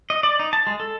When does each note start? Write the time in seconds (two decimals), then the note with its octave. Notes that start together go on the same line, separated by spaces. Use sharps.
0.10 D#5
0.23 D5
0.39 D#4
0.53 A5
0.67 G#3
0.80 A4